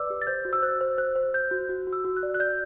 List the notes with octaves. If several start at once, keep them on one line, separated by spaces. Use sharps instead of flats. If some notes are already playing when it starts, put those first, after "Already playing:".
Already playing: B4 D5 D6 E6
G4
A6
C5 G6
F#4
E6
C5 F#6
C5
C5 F#6
C5
C5 G6
F#4
F#4
F#4
E6
F#4
F#6
D5
F#6
D5 G6